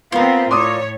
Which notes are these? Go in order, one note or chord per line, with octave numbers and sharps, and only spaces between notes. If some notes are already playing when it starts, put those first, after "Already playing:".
B3 C4 F4 A#4 F5
A2 C#5 D5 C6 D6 D#6